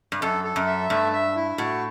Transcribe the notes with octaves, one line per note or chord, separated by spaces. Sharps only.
G2
F#2 A4
A4
F#2
E5
G2 A3
E5
E4
A2 F#4